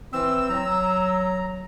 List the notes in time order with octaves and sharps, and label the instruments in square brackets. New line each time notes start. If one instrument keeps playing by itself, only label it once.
[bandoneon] E3 C4 [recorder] E6
[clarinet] F#3 [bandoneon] A#5